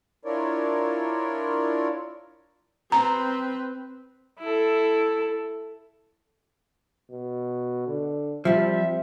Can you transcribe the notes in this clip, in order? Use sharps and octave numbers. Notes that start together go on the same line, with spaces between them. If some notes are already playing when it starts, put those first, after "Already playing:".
D4 E4 F4 A#4 C#5 D5
C4 B4 A#5
E4 A4
B2
D3
F3 G3 C4 E5